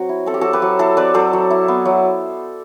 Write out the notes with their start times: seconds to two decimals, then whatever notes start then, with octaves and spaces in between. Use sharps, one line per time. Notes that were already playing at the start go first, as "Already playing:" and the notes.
Already playing: F#3 C4 F#4
0.09 E4
0.26 C4 A4
0.34 G4
0.41 F#3 F#4 A4
0.53 G4 B4
0.62 F#3
0.79 E4 A4 C5
0.97 C4 B4 D5
1.14 F#3 A4 C5
1.33 F#3
1.51 E4
1.68 B3
1.85 F#3